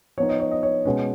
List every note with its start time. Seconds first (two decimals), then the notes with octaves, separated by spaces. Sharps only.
0.17 F3 B3 D#4 C#5
0.29 D#5
0.40 C#5
0.51 D#5
0.63 C#5
0.85 B2 G#3 C#4 B4